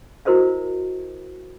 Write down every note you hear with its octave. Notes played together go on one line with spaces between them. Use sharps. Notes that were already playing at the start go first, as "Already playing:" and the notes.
E4 F#4 A#4 C5 D#5 F5